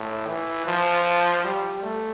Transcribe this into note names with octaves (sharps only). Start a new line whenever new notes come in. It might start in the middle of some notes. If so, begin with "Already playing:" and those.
Already playing: A2
E3
F3
G3
A3